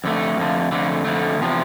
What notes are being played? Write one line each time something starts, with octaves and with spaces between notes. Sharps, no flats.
F2 D3 A3
F2 D3 A3
F2 D3 A3
F2 D3 A3
E2 C3 F3